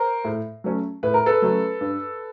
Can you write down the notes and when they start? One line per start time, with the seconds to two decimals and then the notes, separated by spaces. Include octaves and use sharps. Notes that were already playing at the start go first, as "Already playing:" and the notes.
Already playing: A#4 C5
0.25 A2
0.64 F#3 A3 C#4
1.03 A2 B4
1.14 A#4
1.26 A4 B4
1.42 F#3 A3 C#4
1.81 G2